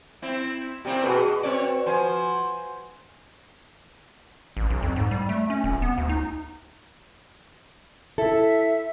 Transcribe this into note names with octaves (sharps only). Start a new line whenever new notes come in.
C4 E4
A#2 C4 E4 G4
B2 F#4 G#4 B4
C4 C#5 D5
F3 C5 G#5
A1
B1
F2
G#2
G3
A3
C#4
D#1
B3
D2
D#4
E4 A4 E5